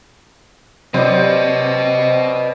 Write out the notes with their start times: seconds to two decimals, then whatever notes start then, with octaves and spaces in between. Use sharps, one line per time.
0.94 C3 F#3 C4 B4 C5 D5 D#5